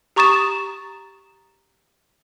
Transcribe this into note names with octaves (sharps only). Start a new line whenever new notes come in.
G4 A#5 C#6 D#6 A6 E7